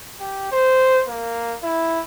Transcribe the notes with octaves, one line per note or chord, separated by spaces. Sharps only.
G4
C5
A#3
E4